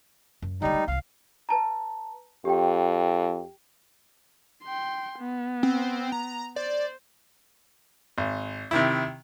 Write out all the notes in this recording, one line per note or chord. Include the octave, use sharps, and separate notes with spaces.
F#2
G2 D3 G3 D#4
A3
C2 C4 F5
B4 A5 A#5
F2 G4 G5
G5 C6
B3
C4
A#5
C5 D5
G#1
C3 D#3 E4